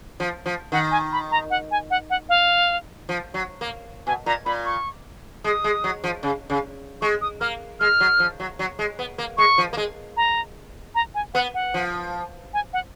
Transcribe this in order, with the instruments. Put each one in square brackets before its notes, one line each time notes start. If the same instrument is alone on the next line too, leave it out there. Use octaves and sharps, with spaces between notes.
[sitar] F3
F3
[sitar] D#3 [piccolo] F#5
[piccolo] G#5
B5
A#5
F#5
G#5
F#5
F#5
F5
[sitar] F3
F#3
A#3
[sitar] B2 [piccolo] G#5
[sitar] A#2 [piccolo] A#5
[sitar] A#2 [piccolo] B5
[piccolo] C#6
[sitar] G#3 [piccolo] D#6
[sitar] G#3
F#3
F3
C#3
C#3
[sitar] G#3 [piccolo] C#6
[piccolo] D#6
[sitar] A#3 [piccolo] F6
[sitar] G#3 [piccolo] F6
[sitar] F#3
F3
F#3
F#3
G#3
B3
A#3
[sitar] G#3 [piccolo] C#6
[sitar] F3
A#3
G#3
[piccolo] A#5
A#5
G#5
[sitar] B3 [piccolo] F#5
[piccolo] F#5
[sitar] F3
[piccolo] G#5
F#5